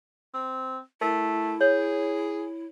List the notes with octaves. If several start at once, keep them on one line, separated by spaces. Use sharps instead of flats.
C4
A3 E4 A#4
G#4 C#5